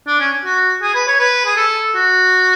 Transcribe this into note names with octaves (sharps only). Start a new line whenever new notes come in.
D4
C#4
F#4
G#4
B4
C#5
B4
G#4
A4
F#4